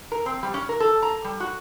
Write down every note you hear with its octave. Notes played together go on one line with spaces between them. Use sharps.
A#4
C4
G3
C#4
A#4
A4
A#5
G3
F#4